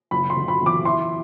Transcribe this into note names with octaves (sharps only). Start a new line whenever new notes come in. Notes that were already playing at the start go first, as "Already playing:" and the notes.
F#1 B5
C6
D3
B5
E2 D6
E4 C6